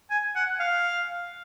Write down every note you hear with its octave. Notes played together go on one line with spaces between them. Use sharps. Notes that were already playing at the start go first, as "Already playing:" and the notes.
G#5
F#5
F5